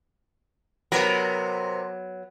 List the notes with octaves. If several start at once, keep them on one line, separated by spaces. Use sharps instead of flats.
C3 F#3 B3 A#4